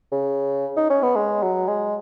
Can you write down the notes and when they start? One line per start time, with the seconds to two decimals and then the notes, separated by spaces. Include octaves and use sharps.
0.12 C#3
0.77 D#4
0.90 C#4
1.03 B3
1.16 G#3
1.42 F#3
1.68 G#3